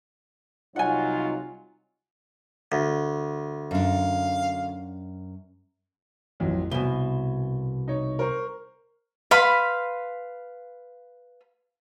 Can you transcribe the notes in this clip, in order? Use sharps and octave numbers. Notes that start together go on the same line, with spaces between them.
C2 F#3 D#4 F4 F#5 G#5
D2
F#2 D4 F5
A1 F2 F#3
C2 B2 G#5 G7
D#4 C#5
A#4 C5 C#6
B4 F5 B5 C6